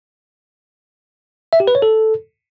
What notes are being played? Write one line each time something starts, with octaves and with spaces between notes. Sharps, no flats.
E5
G4
B4
C#5
A4